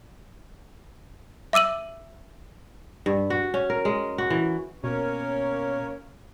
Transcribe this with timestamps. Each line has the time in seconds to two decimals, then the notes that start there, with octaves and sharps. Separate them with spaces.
1.53 E5 D6 E6 D#7 F#7
3.06 G2
3.30 F#4
3.54 C#4
3.70 A#4
3.85 G#3
4.18 F#4
4.30 E3
4.84 B2 A#3 C#4 A#4 C#5